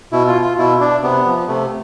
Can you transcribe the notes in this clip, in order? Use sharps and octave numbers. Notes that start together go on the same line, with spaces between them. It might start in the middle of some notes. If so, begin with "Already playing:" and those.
B2 E4
F4
F4
B2 E4
D4
C3 B3
F3
C3 A3